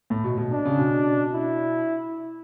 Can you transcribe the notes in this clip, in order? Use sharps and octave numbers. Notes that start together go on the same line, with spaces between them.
A2
B2
B2
D4
C#3
B2
E4